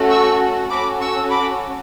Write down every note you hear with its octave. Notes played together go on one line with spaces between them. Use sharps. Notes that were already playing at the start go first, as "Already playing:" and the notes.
Already playing: A3 C#4 F#4 A4
C#6 E6
C#4 F#4 A4 B5 D6
C#6 E6
B5 D6